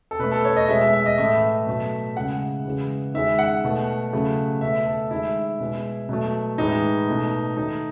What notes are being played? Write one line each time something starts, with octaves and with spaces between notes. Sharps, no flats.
A4
B2 A3 B4
A4
C#5
D#5
B2 G#3 E5
E5
E5
D#5
A2 E3 A3 E5
B2 F#3 A3
C#3 G#3 F#5
C#3 E3 G#3
D#3 G#3 E5
F#5
B2 A3
C#3 F#3 A3
B2 A3 E5
A4
D#3 G#3 E4
B2 G#3
B2 F#3 A3
A2 E3 G#3 D#4
B2 A3
D#3 A3 D#4